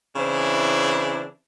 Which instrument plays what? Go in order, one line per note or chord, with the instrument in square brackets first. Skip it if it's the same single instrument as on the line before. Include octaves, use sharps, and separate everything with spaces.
[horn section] C#3 E3 C4 D4 E4